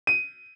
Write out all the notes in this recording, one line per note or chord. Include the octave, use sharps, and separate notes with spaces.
D#7